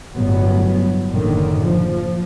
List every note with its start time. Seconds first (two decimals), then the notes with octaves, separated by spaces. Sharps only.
0.13 G1 A2 F#3 B3
1.11 F#1 A2 D3 D#3
1.62 F3